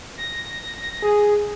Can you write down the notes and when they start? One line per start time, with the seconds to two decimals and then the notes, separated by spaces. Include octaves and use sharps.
0.18 A#6
1.02 G#4